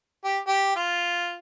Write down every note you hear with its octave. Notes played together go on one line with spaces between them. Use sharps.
G4
G4
F4